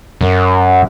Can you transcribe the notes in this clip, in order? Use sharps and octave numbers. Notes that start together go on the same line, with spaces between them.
F#2